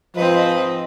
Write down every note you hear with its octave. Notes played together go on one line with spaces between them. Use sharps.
G#2 F3 C4 B4 D#5